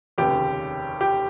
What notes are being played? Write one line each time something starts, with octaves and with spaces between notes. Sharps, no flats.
F1 D#2 C#3 G4
G4